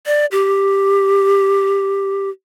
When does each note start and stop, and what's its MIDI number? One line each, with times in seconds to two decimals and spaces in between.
0.06 0.26 74
0.32 2.29 67